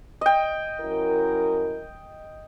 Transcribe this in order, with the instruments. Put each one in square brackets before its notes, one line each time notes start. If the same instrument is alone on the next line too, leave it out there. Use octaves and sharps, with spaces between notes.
[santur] D#5 G5
[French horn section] F#2 E4 A#4